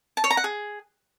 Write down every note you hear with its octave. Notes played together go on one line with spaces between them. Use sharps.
A5
C#5
A#5
F#5
G#4